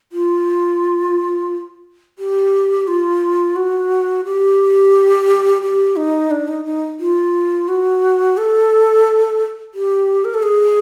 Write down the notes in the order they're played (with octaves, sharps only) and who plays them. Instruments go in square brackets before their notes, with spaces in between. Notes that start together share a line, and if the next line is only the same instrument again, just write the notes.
[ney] F4
G4
F4
F#4
G4
G4
D#4
D4
D#4
D#4
F4
F#4
A4
G4
A#4
A4
G#4